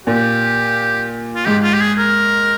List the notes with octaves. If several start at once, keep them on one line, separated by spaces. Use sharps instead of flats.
A#2 G4
F4
G#2 G4
F4
G4
G#4
A#4